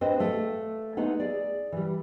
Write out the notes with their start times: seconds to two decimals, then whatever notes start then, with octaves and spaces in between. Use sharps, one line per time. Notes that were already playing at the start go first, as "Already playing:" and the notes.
0.01 C4 D4 B4 C5 D#5
0.19 A3 A4 F5
0.97 G#3 A3 B3 D#4 F#5
1.20 G#4 D5
1.72 E3 G3